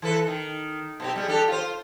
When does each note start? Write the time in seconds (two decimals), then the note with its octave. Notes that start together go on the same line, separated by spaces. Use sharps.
0.02 E3 A4 B4
0.27 D#3
1.00 B2 C4 G4
1.16 G3 G#3
1.28 D4 G4 A4
1.48 F4 C5